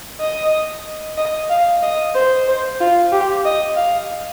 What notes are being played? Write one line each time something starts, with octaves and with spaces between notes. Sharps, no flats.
D#5
D#5
F5
D#5
C5
C5
F4
G4
D#5
F5